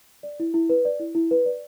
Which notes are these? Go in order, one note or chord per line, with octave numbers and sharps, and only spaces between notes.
D5
E4
E4
B4
D5
E4
E4
B4
D5